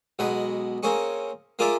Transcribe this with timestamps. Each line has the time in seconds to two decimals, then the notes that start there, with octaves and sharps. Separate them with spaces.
0.19 B1 B2 G#3 B4
0.83 A#3 C4 C#4 G#4 C#6
1.59 A#3 F4 G#4 A#4 D5 E5